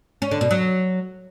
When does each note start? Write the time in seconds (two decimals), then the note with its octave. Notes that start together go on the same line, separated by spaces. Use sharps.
0.22 C#4
0.31 D3
0.41 B2
0.51 F#3